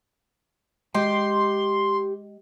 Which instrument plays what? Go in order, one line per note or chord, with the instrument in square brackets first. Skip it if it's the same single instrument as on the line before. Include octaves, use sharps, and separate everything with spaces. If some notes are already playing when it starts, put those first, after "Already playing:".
[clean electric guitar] G#3 D#5 G5 [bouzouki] G4 [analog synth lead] C6